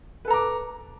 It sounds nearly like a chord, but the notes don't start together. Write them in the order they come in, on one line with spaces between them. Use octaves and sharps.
B4 A4 A#5 D6